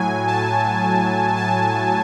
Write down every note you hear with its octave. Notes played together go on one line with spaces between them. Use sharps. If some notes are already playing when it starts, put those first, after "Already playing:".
Already playing: A2 F#3 G#5
A5
A5